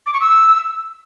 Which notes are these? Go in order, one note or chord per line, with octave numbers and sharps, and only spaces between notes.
D6
C#6
E6